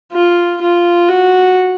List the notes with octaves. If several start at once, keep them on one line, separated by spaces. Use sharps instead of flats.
F4
F4
F#4